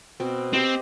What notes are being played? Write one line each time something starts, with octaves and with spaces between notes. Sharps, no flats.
B2 C4
C4 G4 C5 D#5